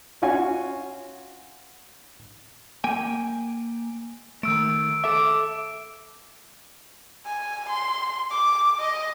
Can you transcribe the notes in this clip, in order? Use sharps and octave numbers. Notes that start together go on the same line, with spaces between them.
C#4 F4 F#4 G#5
A#3 G5 G#5
D#3 A3 E6 D7
A4 E5 D6 D7
G#5
C6
D6
D#5